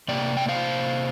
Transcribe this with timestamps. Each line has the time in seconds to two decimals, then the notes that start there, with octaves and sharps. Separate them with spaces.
0.08 C3 A#3 D5 G5
0.37 G5
0.49 C5 F5